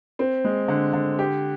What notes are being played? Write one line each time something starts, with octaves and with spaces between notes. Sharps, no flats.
C4
G#3
D3
D3
G4